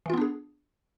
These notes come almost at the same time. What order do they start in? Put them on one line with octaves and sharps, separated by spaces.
E3 F4 B3 D4 G#4